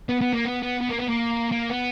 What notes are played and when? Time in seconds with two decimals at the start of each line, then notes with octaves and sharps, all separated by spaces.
0.09 B3
0.21 B3
0.33 A#3
0.45 B3
0.63 B3
0.81 B3
0.89 A#3
0.99 B3
1.08 A#3
1.52 A#3
1.70 B3